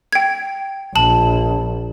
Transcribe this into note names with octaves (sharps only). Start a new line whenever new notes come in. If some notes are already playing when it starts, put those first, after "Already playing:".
G5 G#6
A#1 A5 F#7